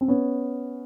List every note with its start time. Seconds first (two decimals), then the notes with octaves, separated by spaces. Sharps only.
0.01 C4
0.08 B3 C#4